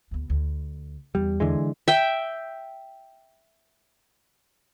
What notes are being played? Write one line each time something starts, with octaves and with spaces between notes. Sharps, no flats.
D2 B3
D2
E2 G3
D3 E3 G#3
E5 G5